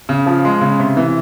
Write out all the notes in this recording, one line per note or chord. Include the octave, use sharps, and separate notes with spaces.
C#3
F3
G#3
C#3
C3
E3